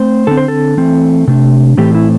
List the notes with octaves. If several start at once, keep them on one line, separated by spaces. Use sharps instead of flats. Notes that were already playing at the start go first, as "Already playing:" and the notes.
Already playing: A3 C4 C5
D3 C4 A4
C5
A4
E3 A3 C4
C3 A3 D4
A2 E3 A3 C4 G4
E4